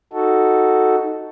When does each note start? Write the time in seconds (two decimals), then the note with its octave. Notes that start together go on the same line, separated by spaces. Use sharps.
0.13 D#4 F#4 A4